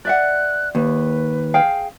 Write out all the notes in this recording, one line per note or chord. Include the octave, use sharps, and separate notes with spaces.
D5 E5 F#5 F#6
D#2 B4
G#4 F5 G5